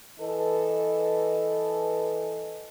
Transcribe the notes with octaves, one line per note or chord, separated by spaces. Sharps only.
E3 A4 B4 D#5